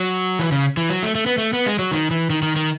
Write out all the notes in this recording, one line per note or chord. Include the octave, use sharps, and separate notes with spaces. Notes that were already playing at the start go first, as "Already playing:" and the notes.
Already playing: F#3
E3
C#3
E3
F#3
A3
A3
B3
A3
B3
G#3
F#3
D#3
E3
D#3
D#3
D#3